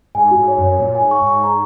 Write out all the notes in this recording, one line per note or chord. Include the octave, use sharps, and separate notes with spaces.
G#2 G#5
F#4
G#2
C#5
F#2
C#5
A#2 C#5
G#5
G#2
C#6
G#2 C#6
A#5